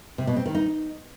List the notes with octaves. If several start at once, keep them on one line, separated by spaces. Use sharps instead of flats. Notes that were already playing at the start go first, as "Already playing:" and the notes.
C3
B2
C4
D#3
D#4